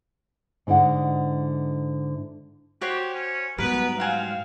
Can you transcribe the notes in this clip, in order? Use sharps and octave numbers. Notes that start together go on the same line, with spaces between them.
G#2 D3 E4 D#5 F#5
F#4 G4 C5 C#5
C#4
G#2 F#3 G3 B3 A#4 B4
C4 F5 F#5 G#5